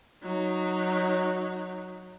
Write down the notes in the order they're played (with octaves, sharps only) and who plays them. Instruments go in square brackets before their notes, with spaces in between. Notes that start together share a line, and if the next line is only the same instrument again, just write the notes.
[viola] F#3 D#4